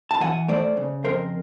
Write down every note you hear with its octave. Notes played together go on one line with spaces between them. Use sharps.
A5
E3 F#5 G#5
A3 C5 D5
C#3
F2 A#4 C5